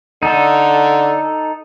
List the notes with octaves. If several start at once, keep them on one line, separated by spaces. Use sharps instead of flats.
D3 D#4 A4